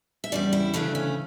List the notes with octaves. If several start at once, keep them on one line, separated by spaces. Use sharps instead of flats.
E5
E2 C#3 G3 D5
E4
D2 C#3 E3 A3 D4
C#4